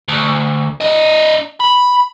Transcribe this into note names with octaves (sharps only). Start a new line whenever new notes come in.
D2
D4 D#5
B5